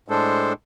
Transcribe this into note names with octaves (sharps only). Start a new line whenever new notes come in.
A2 G#3 D4 A4 C5